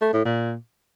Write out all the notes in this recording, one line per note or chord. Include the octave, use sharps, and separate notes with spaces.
A3
A2
A#2